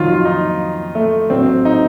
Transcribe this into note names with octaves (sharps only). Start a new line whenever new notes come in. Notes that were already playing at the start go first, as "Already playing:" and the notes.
Already playing: F2 D#3 F#3 F4
F4
D#4
A3
A1 A2 F#3 C4
D#4